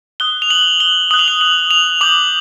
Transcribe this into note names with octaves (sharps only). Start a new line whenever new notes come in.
D#6 F#6 G7
F7
F#7
G7
D#6 F#6 F#7
F7
F#7
F#7
F7
D6 G6 F#7